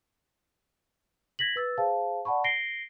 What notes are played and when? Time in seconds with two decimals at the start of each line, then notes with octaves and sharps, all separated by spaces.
1.39 G#6 A#6 B6 F#7
1.56 B4 E6 A6
1.78 G#4 C5 F5 A5
2.25 D5 F#5 A5 B5 C#6
2.44 A#6 C7 D7 G7